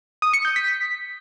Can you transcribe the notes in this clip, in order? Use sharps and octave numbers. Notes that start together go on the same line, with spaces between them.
D#6
C#7
G6
B6